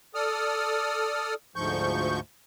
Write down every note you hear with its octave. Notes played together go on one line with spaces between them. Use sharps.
A4 D5 D#6 F6
D2 G#2 F3 C#6 G6